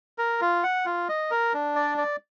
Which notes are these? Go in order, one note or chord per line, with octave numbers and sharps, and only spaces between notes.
A#4
F4
F#5
F4
D#5
A#4
D4
D5
D5